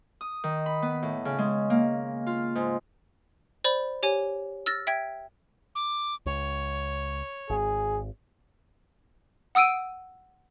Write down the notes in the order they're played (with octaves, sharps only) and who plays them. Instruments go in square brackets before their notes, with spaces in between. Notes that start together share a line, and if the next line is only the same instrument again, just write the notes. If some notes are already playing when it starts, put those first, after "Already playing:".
[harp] D#6
D#3
B5
B3
A2
C#3
G#3
A#3
F4
G#2
[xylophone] C5 D5 B5
G4 C#5 G#5
E6 F6 A6 A#6
E5 G5 G#6
[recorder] D6
[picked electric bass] C#2 [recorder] C#5
[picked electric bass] G#1 [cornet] G#4
[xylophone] F#5 D#6 E6 D7 D#7